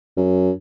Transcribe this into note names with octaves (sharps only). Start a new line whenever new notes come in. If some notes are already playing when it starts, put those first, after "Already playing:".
F#2